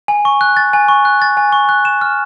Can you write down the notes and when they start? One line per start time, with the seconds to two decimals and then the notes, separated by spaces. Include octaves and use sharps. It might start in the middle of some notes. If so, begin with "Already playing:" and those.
0.08 G#5
0.25 C#6
0.41 F#6
0.57 A6
0.73 G#5
0.88 C#6
1.05 F#6
1.22 A6
1.37 G#5
1.52 C#6
1.69 F#6
1.85 E7
2.01 F6